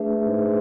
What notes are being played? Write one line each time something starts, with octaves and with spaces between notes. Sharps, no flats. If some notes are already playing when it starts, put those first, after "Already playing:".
Already playing: A3 D4 G#4 B4 E5
G#2